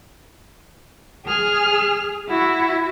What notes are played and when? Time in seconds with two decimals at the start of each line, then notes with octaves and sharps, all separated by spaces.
1.28 G#4 F6
2.28 E4 F#4